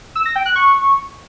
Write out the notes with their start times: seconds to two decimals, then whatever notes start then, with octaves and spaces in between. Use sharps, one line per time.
0.15 E6
0.25 A#6
0.36 G5
0.46 F#6
0.56 C#6